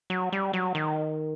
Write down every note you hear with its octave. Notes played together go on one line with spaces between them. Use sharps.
F#3
G3
F#3
D#3